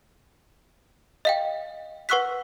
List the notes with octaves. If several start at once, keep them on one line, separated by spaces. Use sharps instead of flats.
D#5 F5 G5
B4 F#5 C#6 E6 F#6 B6